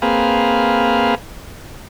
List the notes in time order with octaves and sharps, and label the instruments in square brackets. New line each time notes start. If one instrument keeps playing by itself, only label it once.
[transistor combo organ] A#3 C4 G#4 B4 F5